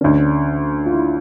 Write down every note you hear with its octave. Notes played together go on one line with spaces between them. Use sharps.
D2 D3 C#4
F4
E4